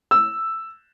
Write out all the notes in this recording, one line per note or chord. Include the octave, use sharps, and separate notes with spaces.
E6